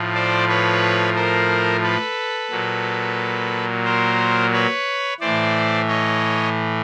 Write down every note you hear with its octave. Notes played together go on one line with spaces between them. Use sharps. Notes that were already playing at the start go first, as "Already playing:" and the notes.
Already playing: A2 F3
C5 D5
B4 C#5
A#4 C5
A4 B4
A#2 F#3
A#4 C5
B4 C#5
A2 E3 C5 D5
C#5 D#5